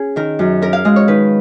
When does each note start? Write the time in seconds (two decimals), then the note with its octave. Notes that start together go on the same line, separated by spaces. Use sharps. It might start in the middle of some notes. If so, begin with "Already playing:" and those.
Already playing: C#4 G#4
0.16 D#3 A#4
0.39 F#2
0.62 C#4 A#4
0.73 F5
0.85 G#3 D#5
0.96 C#5
1.08 D#3 B4